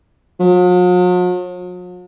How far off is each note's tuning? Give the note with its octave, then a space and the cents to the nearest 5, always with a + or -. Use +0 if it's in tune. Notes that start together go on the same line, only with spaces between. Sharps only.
F#3 -45